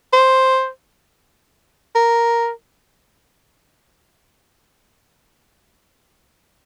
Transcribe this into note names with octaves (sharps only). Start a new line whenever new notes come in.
C5
A#4